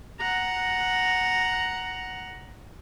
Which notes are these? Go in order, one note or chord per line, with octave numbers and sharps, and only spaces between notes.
F#5 A#5